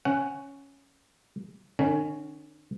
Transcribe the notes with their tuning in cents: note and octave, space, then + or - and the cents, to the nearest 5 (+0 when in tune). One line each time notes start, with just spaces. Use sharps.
C#4 +0 F#5 +15
D#3 -45 C#4 +0